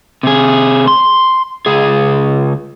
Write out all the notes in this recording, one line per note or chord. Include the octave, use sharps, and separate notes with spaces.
C3 G#4
C6
C#2 G#4